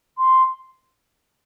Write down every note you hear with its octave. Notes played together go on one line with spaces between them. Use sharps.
C6